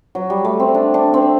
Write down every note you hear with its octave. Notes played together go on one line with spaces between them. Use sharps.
F#3
G3
A3
C4
D4
D4
C4